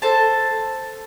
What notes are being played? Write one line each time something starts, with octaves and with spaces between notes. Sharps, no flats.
A4 C5 A5